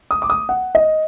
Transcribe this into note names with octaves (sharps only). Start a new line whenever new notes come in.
D#6
D6
D#6
F#5
D#5